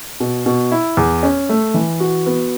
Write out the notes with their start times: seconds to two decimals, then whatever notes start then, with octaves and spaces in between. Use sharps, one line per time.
0.20 B2
0.46 B2
0.71 E4
0.97 E2
1.23 C#4
1.49 A3
1.74 E3
2.00 F#4
2.26 B3